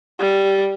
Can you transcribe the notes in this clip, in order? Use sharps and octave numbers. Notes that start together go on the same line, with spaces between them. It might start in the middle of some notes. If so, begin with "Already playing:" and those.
G3